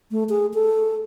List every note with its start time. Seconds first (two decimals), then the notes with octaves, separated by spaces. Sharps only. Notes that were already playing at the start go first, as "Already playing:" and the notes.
0.11 A3
0.29 G#4
0.54 A4